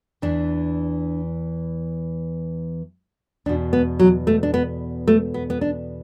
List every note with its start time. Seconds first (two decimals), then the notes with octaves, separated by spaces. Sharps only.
0.22 E2 E3 D4
3.46 E2 B2 D4
3.73 B3
3.99 F#3
4.27 A3
4.43 D4
4.54 B3
5.08 A3
5.34 B3
5.50 B3
5.61 D4